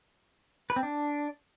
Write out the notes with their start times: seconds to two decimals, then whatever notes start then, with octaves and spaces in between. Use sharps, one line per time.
0.70 B4
0.76 C4
0.83 D4